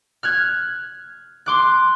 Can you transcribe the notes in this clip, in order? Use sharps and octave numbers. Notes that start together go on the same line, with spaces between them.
F6 F#6 G#6
C6 D6 F#6